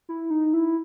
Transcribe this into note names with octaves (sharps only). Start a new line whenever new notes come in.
E4
D#4
E4